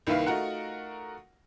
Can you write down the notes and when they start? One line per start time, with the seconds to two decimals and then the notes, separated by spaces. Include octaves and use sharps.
0.07 C2 D#3 A#3 E4 B4 F5
0.26 A3 D#4 F4 F#4 A#4 F#5